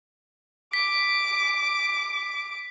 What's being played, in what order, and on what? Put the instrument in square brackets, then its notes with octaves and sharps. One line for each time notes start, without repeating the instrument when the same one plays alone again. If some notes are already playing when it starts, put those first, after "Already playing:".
[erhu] D6 [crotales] B6